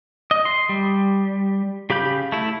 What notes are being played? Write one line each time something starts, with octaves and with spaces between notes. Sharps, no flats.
D#5
C6
G3
C#3 G4 F5 B5 G6
A3 E4